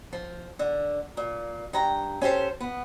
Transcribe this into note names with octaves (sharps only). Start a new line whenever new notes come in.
F3
D3
A#2
G2 G5 A#5
C#4 G4 A4 C5
B3